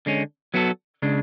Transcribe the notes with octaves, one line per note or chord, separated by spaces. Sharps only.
D3 G#3 C#4
F#3 B3 F#4 A4
C#3 G#3 D4